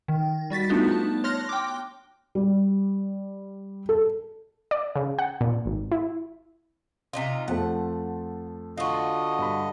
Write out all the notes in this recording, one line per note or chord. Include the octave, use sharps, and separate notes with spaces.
D#3
G3 F#4 A6 B6
A3 B3 D4 D#4 F4
A5
C#5 C6 F6 F#6 A#6
G5 D6
G3
A4
D5
C#3
F#5
A#2
G#1
E4
C3 D#4 F4
F2 F3 A3 F#5
D3 F4 F#4 D#5
G2 B5